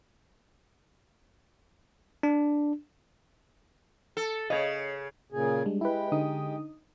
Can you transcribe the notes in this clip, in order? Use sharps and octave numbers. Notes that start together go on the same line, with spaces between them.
D4
A4
C#3 C#5 D#5
A#2 C#3 G#4
G3 G#3 D4
G#3 E4 G4 B4
D3 D#4 D#6